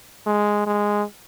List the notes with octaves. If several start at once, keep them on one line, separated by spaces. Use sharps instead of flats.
G#3
G#3